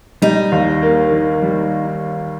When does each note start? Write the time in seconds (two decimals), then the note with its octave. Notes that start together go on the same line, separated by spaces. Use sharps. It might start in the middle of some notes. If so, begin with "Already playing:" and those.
0.22 G3 D#4
0.52 D#2
0.83 A#3
1.12 D#3
1.42 G3